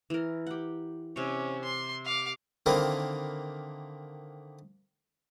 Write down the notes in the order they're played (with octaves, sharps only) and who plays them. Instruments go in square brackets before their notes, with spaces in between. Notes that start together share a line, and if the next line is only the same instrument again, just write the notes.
[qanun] E3 A#4
G4 F#5
[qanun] C3 C#5 [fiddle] C#4
[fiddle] C6
F5 D6
[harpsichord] D3 D#3 A#3 C4 E4